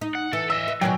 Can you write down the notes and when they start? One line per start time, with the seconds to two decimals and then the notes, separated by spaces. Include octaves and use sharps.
0.01 D#4
0.15 F#5
0.33 E3 A4
0.50 D#5 E5 E6
0.68 B4
0.81 B2 D#3 F#3 D5 G5 G#5